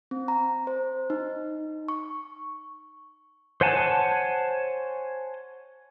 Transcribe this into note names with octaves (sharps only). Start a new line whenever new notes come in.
C4
A#5
C5
D#4
C#6
C5 C#5 F#5 G#5 A5